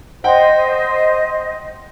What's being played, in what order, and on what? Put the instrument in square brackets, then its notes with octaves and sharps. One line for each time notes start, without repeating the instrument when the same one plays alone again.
[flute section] C5 D#5 [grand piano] F#5 G5